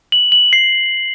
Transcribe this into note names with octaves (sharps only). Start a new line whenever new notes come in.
F#7
F#7
C7